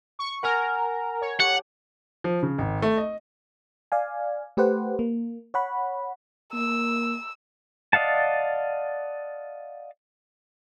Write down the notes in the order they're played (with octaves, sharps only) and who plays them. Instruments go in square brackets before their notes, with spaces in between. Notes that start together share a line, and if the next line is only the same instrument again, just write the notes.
[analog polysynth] C#6
[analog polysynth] A#4 A#5 [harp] F#5 G#5 F6
[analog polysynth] C#5
[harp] G4 A4 [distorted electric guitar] F#5
[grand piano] F3
C#3
G#1
A3
D#5
[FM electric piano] D5 F5 G#5
A3 G4 B4 C5 F#5
A#3
C#5 F#5 B5
[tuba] A#3 [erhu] E6
[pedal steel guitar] D5 D#5 F5 F#5 A5